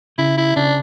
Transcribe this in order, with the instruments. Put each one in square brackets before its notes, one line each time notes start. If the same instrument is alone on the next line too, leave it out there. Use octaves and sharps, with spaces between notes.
[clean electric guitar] C#3 [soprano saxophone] E4
[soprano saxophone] E4
[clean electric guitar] C#3 [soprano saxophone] D4